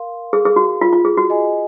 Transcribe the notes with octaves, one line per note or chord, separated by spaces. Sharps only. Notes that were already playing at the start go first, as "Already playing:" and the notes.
Already playing: A#4 F5 C6
G#4
G#4
F#4
F4
F4
G#4
F#4
F4 G#4 D#5 G#5